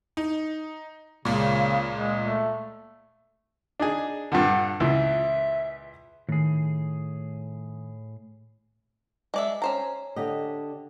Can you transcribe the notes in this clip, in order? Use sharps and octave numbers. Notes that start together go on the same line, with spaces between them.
D#4
C#2 A#2 C#3
G#3
A3
D4 D#4 G#4
G2 A#2 D3 F#5
C#2 A#2 E3 E5
A2 D#3 G#4
G#3 D5 E5
C#4 C5 A#5
D3 G4 D#5